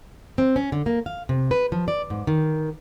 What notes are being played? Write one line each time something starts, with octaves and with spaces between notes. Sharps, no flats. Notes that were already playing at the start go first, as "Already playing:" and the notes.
C4
C#4
D3
A#3
F5
C3
B4
F3
D5
G#2
D#3